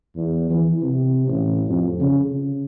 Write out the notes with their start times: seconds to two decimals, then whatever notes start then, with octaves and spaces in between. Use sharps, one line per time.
0.16 E2
0.50 E3
0.82 C3
1.27 A1
1.69 F2
2.00 C#3
2.30 C#3